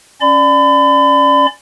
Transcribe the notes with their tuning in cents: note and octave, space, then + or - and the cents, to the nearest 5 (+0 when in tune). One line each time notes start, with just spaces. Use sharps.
C#4 +0 D5 +10 B5 +40